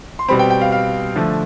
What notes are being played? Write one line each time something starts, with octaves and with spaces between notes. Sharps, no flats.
C6
B2 G3 C4 B5
G5
G5
F5
F5
D3 F3 A3